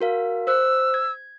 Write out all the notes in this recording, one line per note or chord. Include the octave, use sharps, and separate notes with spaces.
F#4 A#4 F5
C5 E6 F#6
G#6